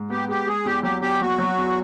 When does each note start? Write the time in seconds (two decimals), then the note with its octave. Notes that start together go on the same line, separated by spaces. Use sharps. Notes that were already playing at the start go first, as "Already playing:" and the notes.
Already playing: G#2
0.10 B3 G4
0.28 G#3 G4
0.47 G#3 G#4
0.65 E2 G4
0.83 F#3 G4
1.02 E2 G4
1.21 F#3 F#4
1.38 F#3
1.58 E2